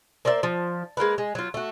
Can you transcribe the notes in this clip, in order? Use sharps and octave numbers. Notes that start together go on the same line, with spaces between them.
A#3 C5 D5 E5
F3
G#3 A#3 A#4 B4
G#3
F#3 F4
A3 F#4